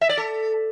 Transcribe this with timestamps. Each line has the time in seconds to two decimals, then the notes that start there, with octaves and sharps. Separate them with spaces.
0.01 E5
0.09 D5
0.17 A4